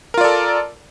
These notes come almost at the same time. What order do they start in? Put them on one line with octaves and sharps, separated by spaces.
A#4 F4 D5 A4